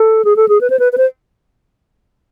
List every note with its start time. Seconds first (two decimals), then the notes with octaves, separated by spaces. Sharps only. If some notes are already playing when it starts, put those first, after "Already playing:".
Already playing: A4
0.25 G#4
0.36 A4
0.48 G#4
0.61 B4
0.70 C5
0.79 B4
0.93 B4
0.98 C5